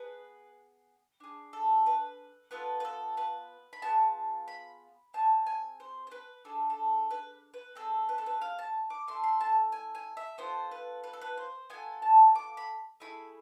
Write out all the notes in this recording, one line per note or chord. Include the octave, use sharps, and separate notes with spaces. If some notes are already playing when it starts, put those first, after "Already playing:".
Already playing: B3 G#4 B4
D4 G#4
A4
B4
B3 F4 A4 B4
B4
A4
B4
B5
B3 F4 G#4 A5
B5
C4 G#4 A5
G#5
C5
C5
B4
D4 G#4 A4
A4
B4
B4
C4 G#4 A4
B4
A4
B4
F5
A5
D6
A3 E4 A4 C6
C6
A5
G#5
G#5
E5
B3 F4 A4 C5
B4
B4
A4
B4
C5
B3 F4 A4 G#5
A5
D6
B5
A3 E4 G#4 B5